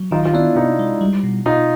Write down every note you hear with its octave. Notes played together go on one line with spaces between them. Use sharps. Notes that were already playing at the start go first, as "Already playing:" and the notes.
Already playing: F#3
D#3 D#4 F4
F4
B3 D4 E4
C3 D#4 F4
G#3
G3
B2
B2 D#4 F4